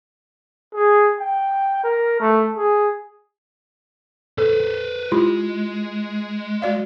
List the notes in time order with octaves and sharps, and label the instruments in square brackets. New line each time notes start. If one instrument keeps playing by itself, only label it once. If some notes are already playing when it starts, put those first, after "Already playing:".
[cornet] G#4
G5
A#4
A3
G#4
[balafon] A4 [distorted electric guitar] B4 C5
[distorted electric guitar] G#3 [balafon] E4 F4 G4
[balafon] F#4 D5 F5